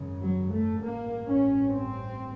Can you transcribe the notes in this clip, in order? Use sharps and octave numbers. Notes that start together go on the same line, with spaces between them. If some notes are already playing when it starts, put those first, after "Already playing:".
Already playing: G#1 F#2 C#3
F#3
A3
A1 G2 A#3
C#4
C4